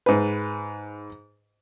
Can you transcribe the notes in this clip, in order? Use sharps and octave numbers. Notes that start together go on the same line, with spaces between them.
G#2 B4